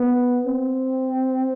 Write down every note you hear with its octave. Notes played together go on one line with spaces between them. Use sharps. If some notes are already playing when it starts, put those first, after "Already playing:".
Already playing: B3
C4